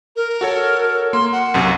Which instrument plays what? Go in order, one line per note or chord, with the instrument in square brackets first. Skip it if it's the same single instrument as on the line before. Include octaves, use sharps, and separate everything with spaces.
[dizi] A#4
[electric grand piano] F#4 A4 C#5
[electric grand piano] A#3 [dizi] C6
[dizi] F#5
[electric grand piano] B1 F#2 C3